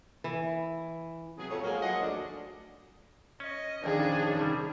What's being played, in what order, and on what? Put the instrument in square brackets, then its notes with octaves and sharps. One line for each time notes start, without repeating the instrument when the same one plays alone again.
[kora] E3
[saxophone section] C3 F#3 B3 G#4
F2 A2 C#5
F#3 G#3 A#3 G#4 A#4 C#5
F3 F#3 G#4 D#5 F#5
D2 D4
[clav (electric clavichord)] C#4 [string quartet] D#5
[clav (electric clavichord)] A#1 F2 [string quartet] D#3 D4 [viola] C#4 G#4
[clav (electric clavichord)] C3 G3